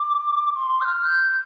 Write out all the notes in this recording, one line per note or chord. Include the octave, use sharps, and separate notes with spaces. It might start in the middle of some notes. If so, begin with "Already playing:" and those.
Already playing: D6
C6
G6
F6
G6
G6